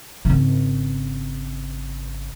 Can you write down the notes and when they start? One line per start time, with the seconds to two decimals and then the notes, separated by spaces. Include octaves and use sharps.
0.25 G#1 C#3